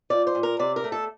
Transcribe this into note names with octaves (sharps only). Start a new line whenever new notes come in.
F3 D5
C5
A#2
A#4
C3 D5
A#4
A3
A4